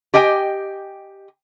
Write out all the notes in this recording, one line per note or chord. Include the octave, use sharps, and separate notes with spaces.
G4 D#5 G5 G#5